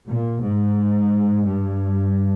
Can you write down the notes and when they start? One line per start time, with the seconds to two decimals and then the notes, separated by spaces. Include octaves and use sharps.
0.08 A#2
0.42 G#2
1.47 G2